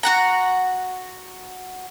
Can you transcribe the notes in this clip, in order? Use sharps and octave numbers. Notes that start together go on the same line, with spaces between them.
F#4 F#5 A#5